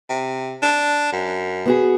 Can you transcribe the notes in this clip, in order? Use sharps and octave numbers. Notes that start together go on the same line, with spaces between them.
C3
D4
F#2
B3 F#4 G#4